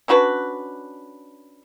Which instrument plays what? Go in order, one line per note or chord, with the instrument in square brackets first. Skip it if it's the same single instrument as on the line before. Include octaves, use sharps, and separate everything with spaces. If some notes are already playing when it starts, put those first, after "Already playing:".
[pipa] C#4 D4 F#4 B4